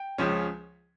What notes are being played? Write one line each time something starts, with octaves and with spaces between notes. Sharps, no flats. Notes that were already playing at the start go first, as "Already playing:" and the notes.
Already playing: G5
C#2 C#3 F3 C#4